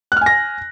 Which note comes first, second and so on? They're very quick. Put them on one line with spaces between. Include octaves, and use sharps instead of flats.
F#6 F6 G#5 A#6